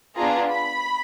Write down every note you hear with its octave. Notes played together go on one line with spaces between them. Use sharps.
B3 D4 F4 G#4 A#5
B5